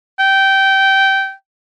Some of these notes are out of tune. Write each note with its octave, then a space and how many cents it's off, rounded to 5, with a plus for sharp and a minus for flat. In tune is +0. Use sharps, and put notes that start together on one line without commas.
G5 -15